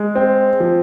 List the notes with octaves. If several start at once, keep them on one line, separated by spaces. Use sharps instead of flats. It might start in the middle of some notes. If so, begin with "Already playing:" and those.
Already playing: G#3
C4
F3